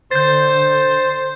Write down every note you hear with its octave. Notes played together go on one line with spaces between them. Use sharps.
D3 C5 G6 A6